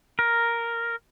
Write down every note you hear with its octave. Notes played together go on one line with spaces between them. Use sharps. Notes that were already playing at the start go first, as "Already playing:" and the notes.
A#4